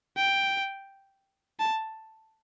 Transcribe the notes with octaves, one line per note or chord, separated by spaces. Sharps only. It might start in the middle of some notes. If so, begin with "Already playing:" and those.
G5
A5